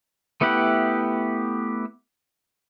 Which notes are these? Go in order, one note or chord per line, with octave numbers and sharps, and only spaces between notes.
A3 B3 E4 G4 F#5